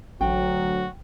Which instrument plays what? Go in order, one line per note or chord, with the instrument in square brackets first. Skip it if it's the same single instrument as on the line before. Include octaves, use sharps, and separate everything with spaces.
[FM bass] A1 [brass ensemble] D2 F#3 [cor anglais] F#4 [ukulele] G5